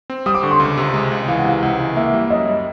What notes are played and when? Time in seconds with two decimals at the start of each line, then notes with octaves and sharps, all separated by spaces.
0.10 C4
0.26 G3 D#6
0.35 D6
0.42 D3 C#6
0.51 C6
0.60 C#2
0.77 C3
0.94 G#3
1.12 C#2
1.28 E3 F5
1.39 F#5
1.45 C3 F5
1.62 C#2 F#5
1.79 E3
1.96 A#3 E5
2.14 G3
2.30 F#2 D#5
2.47 G3